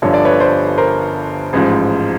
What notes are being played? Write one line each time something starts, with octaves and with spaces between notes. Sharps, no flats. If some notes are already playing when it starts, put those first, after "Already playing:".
G1 G2 D3 F3 C#5
D5
B4 C#5
C5 D5
A#4 C5
A1 G#2 F3